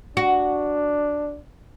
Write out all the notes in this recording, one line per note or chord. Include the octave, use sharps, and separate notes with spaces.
D4 F#4